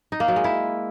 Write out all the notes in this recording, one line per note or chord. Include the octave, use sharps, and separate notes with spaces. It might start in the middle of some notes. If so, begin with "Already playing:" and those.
D#4
A#3
F#3
G#3
E4